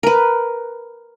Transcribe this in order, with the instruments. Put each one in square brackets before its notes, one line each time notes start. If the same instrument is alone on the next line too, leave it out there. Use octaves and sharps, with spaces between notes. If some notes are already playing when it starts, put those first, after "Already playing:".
[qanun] A#4 B4